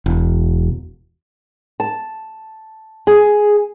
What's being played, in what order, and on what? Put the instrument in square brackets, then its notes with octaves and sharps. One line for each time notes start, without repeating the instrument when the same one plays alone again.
[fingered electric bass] E1
[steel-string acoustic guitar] A5
G#4